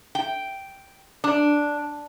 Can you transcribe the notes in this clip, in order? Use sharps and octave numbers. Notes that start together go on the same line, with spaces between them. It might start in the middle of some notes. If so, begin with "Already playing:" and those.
G5
D4